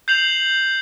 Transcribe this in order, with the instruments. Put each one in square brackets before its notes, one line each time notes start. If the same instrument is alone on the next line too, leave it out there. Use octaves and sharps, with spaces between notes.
[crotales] G6 C7 F7 F#7